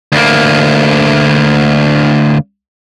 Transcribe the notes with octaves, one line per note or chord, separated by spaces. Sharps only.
D2 A#3